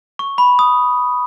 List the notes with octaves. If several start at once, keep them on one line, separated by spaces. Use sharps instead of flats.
C#6
B5
D#6